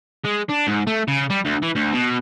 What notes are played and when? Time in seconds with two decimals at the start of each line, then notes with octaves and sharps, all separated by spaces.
0.25 G#3
0.49 D4
0.67 G#2
0.87 A3
1.08 C#3
1.30 G3
1.45 D2
1.63 E3
1.76 D2
1.94 B2